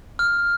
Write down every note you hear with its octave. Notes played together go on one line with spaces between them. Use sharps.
F6